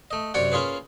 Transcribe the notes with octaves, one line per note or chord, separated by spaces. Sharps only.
A3 D#5
F#2 C3 C#5 D5 F#5
A#3 C#4 F4 G#4 B4